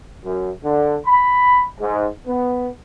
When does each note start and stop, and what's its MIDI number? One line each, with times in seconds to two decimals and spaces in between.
0.24 0.51 42
0.63 0.96 50
1.06 1.64 83
1.80 2.08 44
2.27 2.69 59